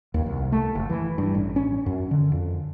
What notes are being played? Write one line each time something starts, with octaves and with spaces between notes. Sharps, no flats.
D#2
C2
A3
F#1
E3
G2
A1
C#4
F#2
D3
F2